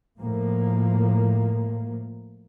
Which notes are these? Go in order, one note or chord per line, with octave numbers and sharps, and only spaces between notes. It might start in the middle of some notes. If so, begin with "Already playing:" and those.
A2 F3 A#3